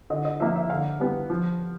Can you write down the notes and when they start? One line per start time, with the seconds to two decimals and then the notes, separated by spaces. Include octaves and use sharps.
0.10 D3 D#5
0.25 D#5
0.40 F3 A#3 E5
0.56 E5
0.70 D3 F5
1.00 G3 B3
1.30 F3